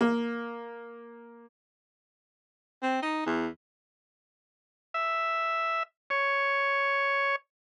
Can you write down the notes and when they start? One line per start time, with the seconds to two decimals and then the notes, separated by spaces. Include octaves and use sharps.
0.01 A#3
2.82 C4
3.02 D#4
3.26 E2
4.94 E5
6.10 C#5